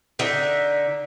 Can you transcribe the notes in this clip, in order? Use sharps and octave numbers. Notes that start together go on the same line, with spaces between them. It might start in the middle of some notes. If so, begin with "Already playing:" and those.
D3 D#4 E5